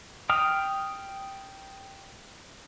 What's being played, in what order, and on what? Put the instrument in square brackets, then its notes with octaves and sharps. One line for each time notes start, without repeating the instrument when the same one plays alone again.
[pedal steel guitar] G5 D#6 F6